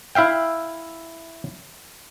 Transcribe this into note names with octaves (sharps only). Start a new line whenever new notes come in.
E4 E5 F5 G5